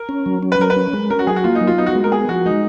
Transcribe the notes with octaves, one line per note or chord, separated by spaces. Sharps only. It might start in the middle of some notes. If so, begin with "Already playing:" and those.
Already playing: A#4
C#4
F#3
C#4
B4
F#3 A#4
B4
C#4
G#3
C#4 A#4
F#4
F#3 G#4
F#4
A#3 F4
D#4
F#3
F4
B3 D#4
F#4
G#3
A#4
B3 G#4
F3 F#4
G#3 D#4